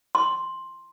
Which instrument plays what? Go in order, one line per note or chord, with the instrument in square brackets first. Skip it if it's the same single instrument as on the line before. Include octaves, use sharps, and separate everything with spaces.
[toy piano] C6